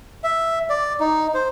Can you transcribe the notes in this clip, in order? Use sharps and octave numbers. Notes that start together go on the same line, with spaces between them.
E5
D5
D#4
C5